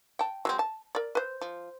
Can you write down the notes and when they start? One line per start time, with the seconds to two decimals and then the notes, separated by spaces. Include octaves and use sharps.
0.19 G5 A5
0.45 F#3 G#3 C4
0.59 A5
0.95 A#4 D5
1.15 B4 C5
1.41 F3